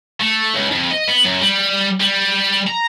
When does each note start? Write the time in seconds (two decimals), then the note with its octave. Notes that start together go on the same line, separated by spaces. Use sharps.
0.20 A3
0.54 C#2
0.72 F2
0.91 D#5
1.08 B3
1.25 F#2
1.42 G3
2.00 G3
2.67 A#5